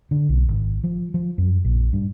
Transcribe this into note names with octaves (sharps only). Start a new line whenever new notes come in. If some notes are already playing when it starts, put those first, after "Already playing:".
D3
B1
G#1
F3
F3
F#2
A#1
G2